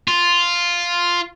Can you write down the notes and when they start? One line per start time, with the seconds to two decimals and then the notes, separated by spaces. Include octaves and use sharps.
0.08 F4